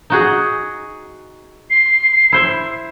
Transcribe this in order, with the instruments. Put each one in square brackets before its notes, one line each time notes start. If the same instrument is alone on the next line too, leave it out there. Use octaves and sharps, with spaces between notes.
[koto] D#4 F#4 G#4
[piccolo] C7
[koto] E4 C5 E5